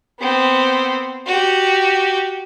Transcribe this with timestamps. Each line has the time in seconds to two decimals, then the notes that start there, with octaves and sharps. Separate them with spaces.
0.20 B3 C4
1.27 F#4 G4